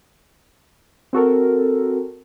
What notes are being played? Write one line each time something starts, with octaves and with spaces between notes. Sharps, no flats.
C4 F#4 A4 A#4